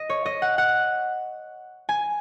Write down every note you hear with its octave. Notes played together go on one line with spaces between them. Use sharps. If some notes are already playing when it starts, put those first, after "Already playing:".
Already playing: D#5
C#5
D#5
F#5
F#5
G#5